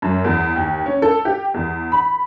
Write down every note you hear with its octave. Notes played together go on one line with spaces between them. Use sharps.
F#2
E2
D#2
C#4
A4
G4
E2
B5